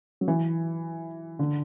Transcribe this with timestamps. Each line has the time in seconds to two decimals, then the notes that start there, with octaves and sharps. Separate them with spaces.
0.21 F#3
0.28 E3
1.39 D3